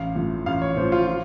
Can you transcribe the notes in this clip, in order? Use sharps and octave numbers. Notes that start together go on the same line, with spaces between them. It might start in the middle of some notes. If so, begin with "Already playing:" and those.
Already playing: A1 F5
A2 F3
A1 F5
C#5
A2 F3 C5
F4
F4